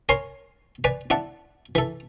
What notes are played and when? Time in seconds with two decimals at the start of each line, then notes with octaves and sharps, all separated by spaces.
0.09 A#4 C#5 G#5 C6
0.84 B4 D5 G#5
1.10 E4 D5 F#5 A5
1.75 E3 A4